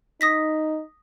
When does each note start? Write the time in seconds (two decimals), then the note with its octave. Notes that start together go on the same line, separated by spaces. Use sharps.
0.21 D#4 D#6 A#6 B6